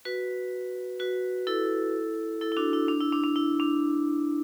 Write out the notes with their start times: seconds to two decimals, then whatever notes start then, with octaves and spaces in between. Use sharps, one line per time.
0.05 F#4 B4
0.99 F#4 B4
1.47 E4 A4
2.41 E4 A4
2.52 E4
2.57 D4 F#4
2.73 E4
2.88 D4
3.01 E4
3.12 D4
3.24 D4
3.36 E4
3.60 D4